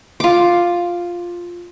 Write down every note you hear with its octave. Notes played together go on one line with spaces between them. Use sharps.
F4 D6